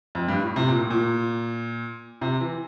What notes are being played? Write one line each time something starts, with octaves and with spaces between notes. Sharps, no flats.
F2
G2
A2
C3
A#2
A2
A#2
C3
E3